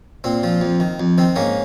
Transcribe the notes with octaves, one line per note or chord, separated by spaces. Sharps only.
A#2 C4
F3
F2
D#3
F2
D#3 C4
G#2 A#3 C#4